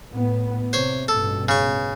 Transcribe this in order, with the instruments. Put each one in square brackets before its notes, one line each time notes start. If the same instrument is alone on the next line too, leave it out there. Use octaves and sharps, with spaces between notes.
[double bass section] A2 B3
[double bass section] C3 [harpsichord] C5 C#5
[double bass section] A1 G2 B2 [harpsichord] A4
[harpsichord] C#3 C#6